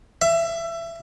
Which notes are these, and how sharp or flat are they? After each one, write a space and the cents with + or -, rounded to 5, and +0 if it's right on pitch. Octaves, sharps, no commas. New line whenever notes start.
E5 +25